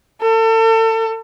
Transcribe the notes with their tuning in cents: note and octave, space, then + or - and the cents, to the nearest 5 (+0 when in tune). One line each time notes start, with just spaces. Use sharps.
A4 +35